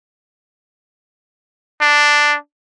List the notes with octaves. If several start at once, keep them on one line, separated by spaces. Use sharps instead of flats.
D4